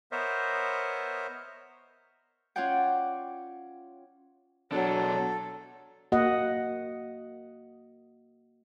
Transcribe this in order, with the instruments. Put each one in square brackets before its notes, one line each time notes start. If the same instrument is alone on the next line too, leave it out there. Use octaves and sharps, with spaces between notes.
[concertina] B3 A#4 C5 C#5 D#5 E5
[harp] C#4 F4 C#5 D5 F#5 G5
[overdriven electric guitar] B2 D4 [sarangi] F#3 [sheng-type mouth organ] A4
[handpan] A#3 F#4 D#5 F#5